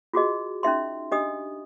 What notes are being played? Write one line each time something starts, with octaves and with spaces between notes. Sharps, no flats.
F4 F#4 G#4 D#5
C#4 D#4 E5 C6
D4 G4 D#5 D#6